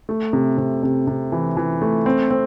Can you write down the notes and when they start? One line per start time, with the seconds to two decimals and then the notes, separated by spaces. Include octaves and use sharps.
0.09 A3
0.33 C3
0.58 C3
0.83 C3
1.07 C3
1.32 E3
1.57 E3
1.82 A3
2.06 C4
2.30 C4